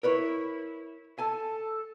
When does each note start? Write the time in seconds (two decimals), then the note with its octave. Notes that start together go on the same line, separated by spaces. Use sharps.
0.03 E4 A#4 B4 C#5
1.18 A4 G#5 A5